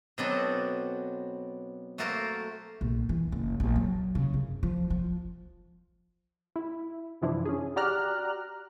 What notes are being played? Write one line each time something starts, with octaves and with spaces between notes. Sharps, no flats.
B2 F#3 B3 C4 D4 A4
A3 A#3 F#4 A4 A#4 C5
A#1
E3
F#1
A#1
F#3
C#3
F#2
F3
F3
E4
F#2 C3 E3 F3 D4 E4
C#4 G#4
F#4 G4 D5 A#5 F6 F#6